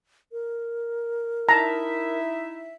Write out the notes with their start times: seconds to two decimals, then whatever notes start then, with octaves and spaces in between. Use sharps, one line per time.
0.32 A#4
1.49 D#4 E4 E5 A5 A#5